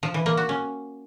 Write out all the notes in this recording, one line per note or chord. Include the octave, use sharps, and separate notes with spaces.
F3
E3
A#3
F#4
C#4